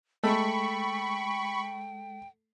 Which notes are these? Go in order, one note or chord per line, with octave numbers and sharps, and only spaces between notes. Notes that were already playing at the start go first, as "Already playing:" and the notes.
G#3 A3 G5 B5 C#6